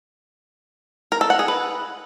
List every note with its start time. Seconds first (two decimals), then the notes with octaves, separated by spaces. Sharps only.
1.12 A#4
1.21 A4
1.30 F#5
1.39 G#4
1.48 B4